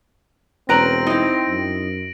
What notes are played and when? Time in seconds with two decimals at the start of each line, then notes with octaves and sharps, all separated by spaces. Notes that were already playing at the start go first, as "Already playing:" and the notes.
0.69 E1 C4 C#4 B4 A#5 A#6 D7 F#7
1.07 D#4 E4
1.49 F#2